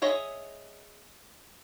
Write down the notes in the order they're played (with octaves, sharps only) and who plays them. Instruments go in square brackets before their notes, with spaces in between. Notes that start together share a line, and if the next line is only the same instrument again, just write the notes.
[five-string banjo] G#4 C#5 D#5 E5